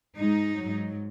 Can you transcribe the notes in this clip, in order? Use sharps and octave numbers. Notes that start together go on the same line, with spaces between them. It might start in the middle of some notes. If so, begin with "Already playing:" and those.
G#2 G#3 D#4
G#2 F#3